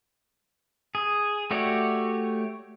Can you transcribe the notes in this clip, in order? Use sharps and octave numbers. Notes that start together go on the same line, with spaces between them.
G#4
A3 F#4 G4 C#5 D5